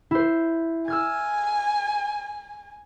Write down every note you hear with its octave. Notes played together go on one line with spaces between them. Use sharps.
E4 C5
G#5 E6 F6 G#6